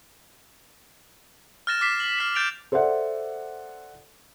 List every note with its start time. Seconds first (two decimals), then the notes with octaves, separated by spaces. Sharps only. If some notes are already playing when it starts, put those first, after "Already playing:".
1.67 F6 F#6 A6 A#6 E7
1.81 D6 F6 B6 C7 E7
2.00 F#7
2.18 F6 B6 C7
2.35 F#6 G6 A6 D7 E7 F7
2.72 A4 C5 D5 E5 F#5